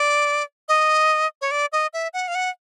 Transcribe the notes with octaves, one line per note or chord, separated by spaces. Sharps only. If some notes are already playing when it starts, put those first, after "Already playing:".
Already playing: D5
D#5
C#5
D5
D#5
E5
F#5
F5
F#5